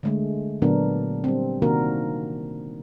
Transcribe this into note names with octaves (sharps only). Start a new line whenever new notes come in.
D3 G#3 A3
A#2 D3 F#3 B3 D4 A#4
G3 C4
C3 D#3 A#3 D4 F#4 A#4